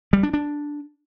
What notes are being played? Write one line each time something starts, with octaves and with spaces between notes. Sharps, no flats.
G3
D4
D4